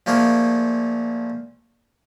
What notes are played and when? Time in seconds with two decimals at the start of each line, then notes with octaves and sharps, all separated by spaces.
0.06 A#2 F3 A3 A#3 G#4